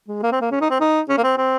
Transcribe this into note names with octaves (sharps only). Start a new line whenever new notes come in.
G#3
A#3
C4
A#3
C#4
D#4
C4
D#4
C#4
A#3
C4
C4